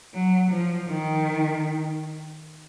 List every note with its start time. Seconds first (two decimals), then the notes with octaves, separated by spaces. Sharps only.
0.14 F#3
0.51 F3
0.89 D#3